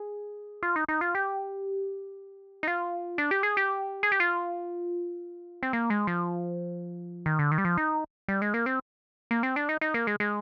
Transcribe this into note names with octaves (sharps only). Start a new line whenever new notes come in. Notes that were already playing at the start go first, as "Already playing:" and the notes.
Already playing: G#4
F4
D#4
D#4
F4
G4
D#4
F4
D4
G4
G#4
G4
G#4
G4
F4
C4
A#3
G#3
F3
D#3
D3
D#3
G3
F3
D#4
G3
G#3
A#3
C4
A#3
C4
D4
D#4
D#4
A#3
G#3
G#3